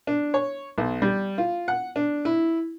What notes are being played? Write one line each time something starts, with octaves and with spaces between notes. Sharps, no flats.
D4
C#5
B1
G3
F4
F#5
D4
E4